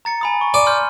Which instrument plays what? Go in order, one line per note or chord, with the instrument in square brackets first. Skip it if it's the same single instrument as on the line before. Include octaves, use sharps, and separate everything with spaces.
[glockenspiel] A#5 A6 C#7
G#5 B5 D#6
C#6
[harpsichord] D5 [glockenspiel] D#7
[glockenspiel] C6 F6 G6